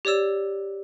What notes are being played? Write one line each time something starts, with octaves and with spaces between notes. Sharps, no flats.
G4 C#5 D5 E6 E7